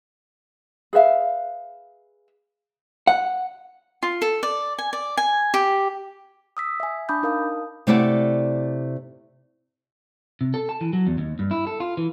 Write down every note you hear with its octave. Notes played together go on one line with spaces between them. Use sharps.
G#4 B4 E5 F5
F#5
F4
A4
D5
G#5
D5
G#5
G4
D#6 E6 B6
E5 G#5
D4 A5 B5 D6 D#6 G6
D#4 A#4 F5 D#6
C3 A3 E4 D5 F#5
C3
A4
A5
E3
F#3
E2
D#2
G2
E4
A4
F4
E3